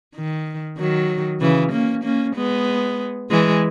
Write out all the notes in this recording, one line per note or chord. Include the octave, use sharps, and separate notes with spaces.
D#3
D#3 F#3
C#3 E3
A#3 C#4
A#3 C#4
G#3 B3
E3 G#3